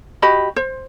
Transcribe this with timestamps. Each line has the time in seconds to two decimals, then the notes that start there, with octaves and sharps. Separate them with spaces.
0.22 F#4 G4 D#5 B5
0.56 C5